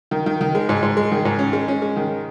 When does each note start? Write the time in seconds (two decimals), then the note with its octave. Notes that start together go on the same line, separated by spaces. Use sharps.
0.11 D#3
0.26 D#3
0.41 D#3
0.55 G#3
0.69 G#2
0.83 G#2
0.97 G#3
1.12 D#3
1.25 G#2
1.39 C#4
1.53 G#3
1.68 C#4
1.82 G#3
1.96 D#3